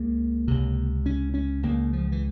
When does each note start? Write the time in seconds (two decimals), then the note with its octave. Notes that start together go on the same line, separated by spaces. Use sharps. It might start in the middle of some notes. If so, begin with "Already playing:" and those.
Already playing: C#2 C#3 A#3
0.48 C#2 C3
1.06 C#4
1.34 C#4
1.63 C#2 C#3 A#3
1.93 F3
2.12 E3